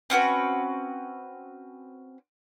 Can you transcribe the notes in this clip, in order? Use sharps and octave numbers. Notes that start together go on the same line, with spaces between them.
C4 C#4 F#4 B4